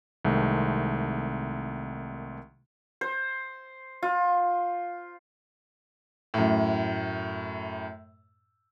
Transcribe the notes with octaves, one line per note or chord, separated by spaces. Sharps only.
C2 D#3 G#3 A3 C4
C5
F4
F#2 A2